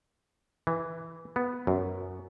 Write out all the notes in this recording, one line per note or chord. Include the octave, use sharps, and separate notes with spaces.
E3
B3
F#2